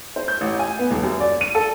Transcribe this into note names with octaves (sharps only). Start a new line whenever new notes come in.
C5
G6
A1
G#5
B3
D#1
F#2
D5
D#7
A4